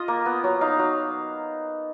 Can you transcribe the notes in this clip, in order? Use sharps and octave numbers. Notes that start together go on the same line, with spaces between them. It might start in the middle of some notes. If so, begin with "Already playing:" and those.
Already playing: F4 D#5
A#3
B3
F#3
D#4 F5
F#3